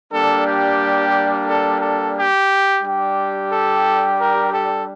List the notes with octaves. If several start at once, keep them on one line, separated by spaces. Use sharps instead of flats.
G3 A#3 D4 A4
G4
A4
A4
G4
G3 D4 G4
A4
A#4
A4